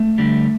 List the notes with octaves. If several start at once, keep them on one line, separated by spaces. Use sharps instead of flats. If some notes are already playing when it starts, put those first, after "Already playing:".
Already playing: A3
D2 D3 G3